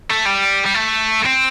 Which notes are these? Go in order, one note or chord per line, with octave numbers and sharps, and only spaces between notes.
A3
G3
G3
A3
C4